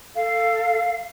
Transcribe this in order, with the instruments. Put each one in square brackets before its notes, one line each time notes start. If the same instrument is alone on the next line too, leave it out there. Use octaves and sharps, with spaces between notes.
[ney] A4 [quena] F5